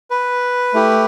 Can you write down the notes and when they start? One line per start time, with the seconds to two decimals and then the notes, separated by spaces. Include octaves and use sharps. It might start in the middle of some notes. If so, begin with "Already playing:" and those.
0.10 B4
0.74 A3 E4 G4